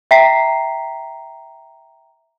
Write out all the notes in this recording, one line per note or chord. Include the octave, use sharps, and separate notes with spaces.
E5 G5 A#5 B6 C7